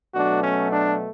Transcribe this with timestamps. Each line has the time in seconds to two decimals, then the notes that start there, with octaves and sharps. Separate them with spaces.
0.14 B2 F#3 A3 D4 F#4
0.43 C#4
0.73 D4